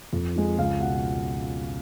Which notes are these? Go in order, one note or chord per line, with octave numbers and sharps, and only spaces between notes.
F2
F3 G#3
C#2 F5
B2 F#5